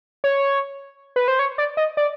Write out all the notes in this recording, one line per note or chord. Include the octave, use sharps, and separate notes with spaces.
C#5
B4
C5
C#5
D5
D#5
D5